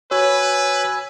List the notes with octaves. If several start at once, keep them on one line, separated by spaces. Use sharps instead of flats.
F#4 B4 C#5 G#5 E6